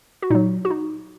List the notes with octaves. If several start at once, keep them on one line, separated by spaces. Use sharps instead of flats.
F#4
A#2 F#3 D#4
F#4
D#4